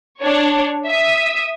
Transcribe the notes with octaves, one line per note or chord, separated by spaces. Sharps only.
D4 C#5
E5 D#6